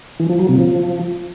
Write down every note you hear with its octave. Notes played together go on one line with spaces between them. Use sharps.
E3
F3
F#3
C3
F3